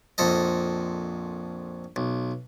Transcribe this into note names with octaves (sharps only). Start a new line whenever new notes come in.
A#1 F2 A4 D#5
B1